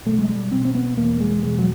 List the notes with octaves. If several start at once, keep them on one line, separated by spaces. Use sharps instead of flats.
B2 A3
G#3
G3
B2 C4
C4
B3
E2 A#3
G#3
B2 G#3
F#3